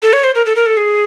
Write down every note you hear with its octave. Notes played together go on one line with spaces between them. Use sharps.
A4
C#5
C5
A#4
A4
A#4
A4
G#4